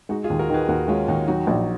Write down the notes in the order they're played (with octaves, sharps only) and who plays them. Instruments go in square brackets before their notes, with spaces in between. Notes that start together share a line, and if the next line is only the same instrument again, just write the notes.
[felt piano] G#3 [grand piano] D#4 F#4
[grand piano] F4 G#4
[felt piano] D#2
[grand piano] F#4 A#4
[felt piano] D#3 [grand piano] G#4 B4
[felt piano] D#2 [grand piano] F#4 A#4
[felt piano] G#3 [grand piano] C#4 F4
[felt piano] D#2 [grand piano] D#4 F#4
[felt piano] F#3 [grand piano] D#4 F#4
[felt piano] A#1